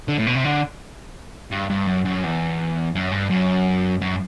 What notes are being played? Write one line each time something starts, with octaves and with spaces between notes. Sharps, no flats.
D3
A2
B2
C3
D3
G2
G2
F#2
F#2
E2
F#2
G2
F#2
F#2